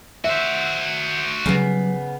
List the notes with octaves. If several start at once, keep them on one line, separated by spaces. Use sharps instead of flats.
F#4 C5 E5
C#3 F#3 G3 B3